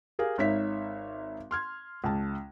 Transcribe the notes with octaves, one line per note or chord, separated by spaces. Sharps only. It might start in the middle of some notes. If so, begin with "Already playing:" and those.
G4 G#4 A#4 F5
G#1 D#4 C#5 E5 B6
C6 F6 G#6
C#2 A5